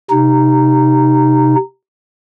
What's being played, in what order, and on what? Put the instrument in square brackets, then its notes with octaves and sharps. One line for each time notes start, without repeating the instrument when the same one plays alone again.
[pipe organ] C3 D#4